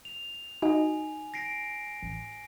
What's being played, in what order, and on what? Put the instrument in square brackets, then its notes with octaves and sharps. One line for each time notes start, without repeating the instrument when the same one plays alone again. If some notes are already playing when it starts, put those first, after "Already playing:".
[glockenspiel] F7
[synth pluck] D#4 F#4 D#5 [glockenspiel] G#5
[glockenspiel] A#6 C7 D7
[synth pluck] A1